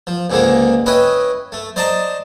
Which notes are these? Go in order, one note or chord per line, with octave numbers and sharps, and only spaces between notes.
F3
C#2 G#2 D3 D#3 G#3 A#3
C#4 E4 B4 D#5 G5
A3
C5 D5 D#5 A5 A#5